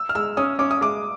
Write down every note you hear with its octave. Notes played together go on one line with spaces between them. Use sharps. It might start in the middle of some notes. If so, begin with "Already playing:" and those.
Already playing: E6
F6
G#3 E6
C#4 D#6
C#4 D6
D#6
G#3 D6